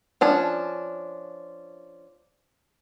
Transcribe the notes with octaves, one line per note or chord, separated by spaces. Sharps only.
F3 C#4 D4